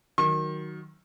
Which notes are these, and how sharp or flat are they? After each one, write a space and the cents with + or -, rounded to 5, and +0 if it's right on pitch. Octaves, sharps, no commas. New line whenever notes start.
D#3 +0 F#3 +5 C#6 -45